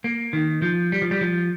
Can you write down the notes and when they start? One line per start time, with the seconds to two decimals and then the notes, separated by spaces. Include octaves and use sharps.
0.04 A#3
0.33 D#3
0.62 F3
0.92 G3
1.02 F3
1.11 G3
1.21 F3